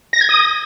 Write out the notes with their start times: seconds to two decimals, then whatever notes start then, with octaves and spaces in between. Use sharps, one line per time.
0.13 A#6
0.21 G#6
0.29 D#6